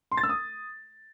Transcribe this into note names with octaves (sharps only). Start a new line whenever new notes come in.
C6
A6
E6
D#6